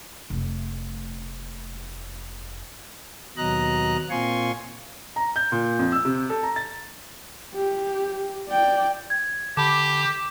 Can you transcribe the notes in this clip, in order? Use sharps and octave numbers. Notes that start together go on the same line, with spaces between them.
F1 A3
D#2 B2 F#3 D#5 A#5 F#6
A#2 C4 F4 G#5 C6 C#6
A#5
G6
A#2
F2
E6
C3
A4
A#5
A6
G4
D5 G5
G#6
D3 G4 A5 B5 D6